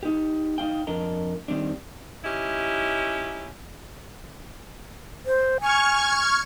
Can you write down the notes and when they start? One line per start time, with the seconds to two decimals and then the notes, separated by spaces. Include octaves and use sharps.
0.03 D#4 G4
0.58 D#4 F5 G5
0.87 F2 D4 A#4 D#5 A#5
1.48 D#3 G3 C4 D4
2.24 C#4 D#4 E4 G4
5.26 C5
5.61 G#5 C#6 F6 G#6